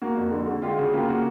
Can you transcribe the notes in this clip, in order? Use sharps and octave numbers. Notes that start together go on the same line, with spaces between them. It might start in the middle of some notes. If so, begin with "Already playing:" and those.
A#3 F#4
F2
D3
D3
G#3 F4 G4
C#3 F#4 G#4
A#3 F4 G4
A#3 F#4